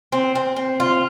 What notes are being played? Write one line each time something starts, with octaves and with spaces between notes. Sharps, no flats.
C4
C4
C4
F4